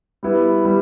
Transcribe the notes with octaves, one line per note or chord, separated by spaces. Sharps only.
G3 B3 E4
G3 B3